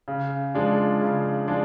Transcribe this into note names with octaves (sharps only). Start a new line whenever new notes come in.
C#3
F3 G#3 D4
C#3
F3 G#3 D4